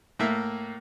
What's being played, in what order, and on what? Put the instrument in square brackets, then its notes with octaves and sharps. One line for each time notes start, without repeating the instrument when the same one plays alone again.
[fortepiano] A2 A#3 E5